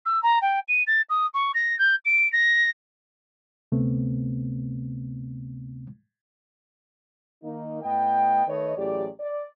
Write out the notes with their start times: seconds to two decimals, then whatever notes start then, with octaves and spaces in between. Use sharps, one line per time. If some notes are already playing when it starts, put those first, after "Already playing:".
0.05 E6
0.23 A#5
0.42 G5
0.68 D#7
0.87 A6
1.09 D#6
1.34 C#6
1.54 A#6
1.79 G6
2.05 D7
2.32 A#6
3.72 D2 C3 A3 B3 C4
7.44 D#3 A#3 D#4
7.83 A2 B3 D#5 G5
8.47 D#3 A3 B4 C#5 D#5
8.77 A1 A2 F#3 G4 G#4 D5
9.20 D5